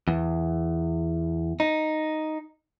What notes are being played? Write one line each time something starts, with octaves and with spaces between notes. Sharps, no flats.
E2
D#4